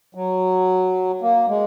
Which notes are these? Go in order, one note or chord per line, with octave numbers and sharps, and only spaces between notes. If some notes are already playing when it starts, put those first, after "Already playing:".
F#3
A#3
G#3